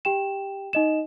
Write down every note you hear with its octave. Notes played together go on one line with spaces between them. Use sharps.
G4 G5 E7
D#4 D#5 E7